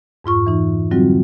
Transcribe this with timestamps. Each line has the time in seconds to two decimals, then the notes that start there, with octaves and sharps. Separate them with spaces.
0.24 F2 G#2 F4 C#6
0.46 E3 D#4
0.91 D3 F#3 G3 C4 F4 F#4